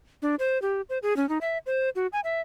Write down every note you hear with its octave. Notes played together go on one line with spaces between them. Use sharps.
D4
C5
G4
C5
G#4
C#4
D#4
E5
C5
F#4
G#5
E5